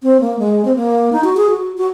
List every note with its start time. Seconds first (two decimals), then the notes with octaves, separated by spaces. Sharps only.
0.03 C4
0.21 A#3
0.39 G#3
0.65 C4
0.76 A#3
1.13 D#4
1.24 F#4
1.37 G#4
1.49 F#4
1.77 F#4